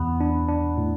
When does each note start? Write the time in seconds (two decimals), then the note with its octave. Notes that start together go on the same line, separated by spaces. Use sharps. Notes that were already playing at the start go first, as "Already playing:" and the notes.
Already playing: E2 B3
0.21 D4
0.49 D4
0.78 A2